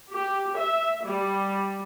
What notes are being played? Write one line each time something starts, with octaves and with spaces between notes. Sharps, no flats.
G4
E5
G3